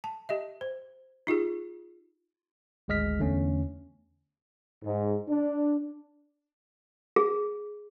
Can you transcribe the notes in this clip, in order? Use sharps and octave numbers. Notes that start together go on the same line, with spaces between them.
A5
G4 D#5 E5
C5
D#4 F4 G4 G#4
G#1 D2 G#3 D#5 F6 B6
E2 D3 A3 C#4
G#2
D4
G#4